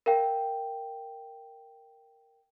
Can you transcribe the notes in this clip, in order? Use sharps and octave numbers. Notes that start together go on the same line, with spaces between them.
A#4 F5 G5